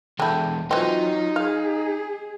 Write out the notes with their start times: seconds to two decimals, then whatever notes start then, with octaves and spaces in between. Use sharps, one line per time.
0.20 E2 D3 G#3 E4 G5 A5 G6
0.71 E3 F#3 C4 D#4 F4 D#5
1.36 G#4 F5